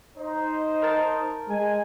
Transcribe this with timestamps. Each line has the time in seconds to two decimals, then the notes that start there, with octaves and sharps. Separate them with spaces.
0.18 D#4 C5
0.82 A#4 A5
1.49 G#3 G#5